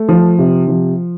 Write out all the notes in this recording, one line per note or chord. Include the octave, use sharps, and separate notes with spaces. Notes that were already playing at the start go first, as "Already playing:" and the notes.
Already playing: A3
F3
C3
F3